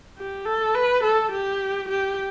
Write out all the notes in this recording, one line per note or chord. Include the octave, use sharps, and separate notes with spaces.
G4
A4
B4
A4
G4
G4